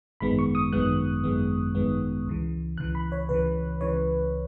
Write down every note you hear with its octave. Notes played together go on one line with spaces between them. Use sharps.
G#1 F#2 D#3 G#3 B3 B5
C#6
D#6
G#1 F#2 D#3 G#3 B3 F#6
G#1 F#2 D#3 G#3 B3
G#1 F#2 D#3 G#3 B3
C#2 C#3 E3
C#2 C#3 E3 F#6
B5
C#5
C#2 C#3 E3 B4
C#2 C#3 E3 C#5